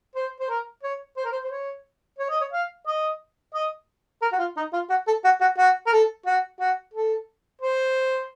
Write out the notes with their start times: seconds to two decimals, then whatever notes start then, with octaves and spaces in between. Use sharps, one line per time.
0.15 C5
0.40 C5
0.49 A#4
0.83 C#5
1.17 C5
1.25 A#4
1.32 C5
1.44 C5
1.51 C#5
2.19 C#5
2.30 D#5
2.41 C#5
2.53 F5
2.87 D#5
3.54 D#5
4.22 A#4
4.33 F#4
4.39 F4
4.57 D#4
4.73 F4
4.90 F#4
5.07 A4
5.24 F#4
5.41 F#4
5.58 F#4
5.87 A#4
5.92 A4
6.26 F#4
6.60 F#4
6.94 A4
7.61 C5